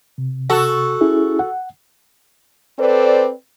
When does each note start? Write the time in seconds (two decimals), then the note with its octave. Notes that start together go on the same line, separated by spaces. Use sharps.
0.18 C3
0.50 F#4 A4
1.01 C#4 E4 G#4
1.39 F#5
2.78 C4 A4 B4 C5 D5